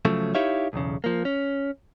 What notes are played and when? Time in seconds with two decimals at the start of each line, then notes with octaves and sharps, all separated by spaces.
0.05 C#3 F3 F#3 A3
0.35 D#4 E4 G4 C#5 E5 F5
0.73 B1 E2 C#3
1.04 F3 A#3
1.25 C#4